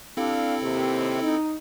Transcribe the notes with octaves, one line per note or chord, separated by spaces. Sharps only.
C4 D4 E4 G4 A4 F5
D#2 C3
D#4